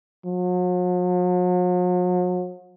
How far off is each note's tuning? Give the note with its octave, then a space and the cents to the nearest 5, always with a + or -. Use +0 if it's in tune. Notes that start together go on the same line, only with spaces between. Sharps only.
F#3 -45